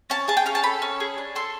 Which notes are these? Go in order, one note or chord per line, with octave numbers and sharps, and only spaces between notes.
C#4 A5
G#4 A5
G5
C#4 F5
A5
A4 B5
C#4
G#4
D4
A4 C6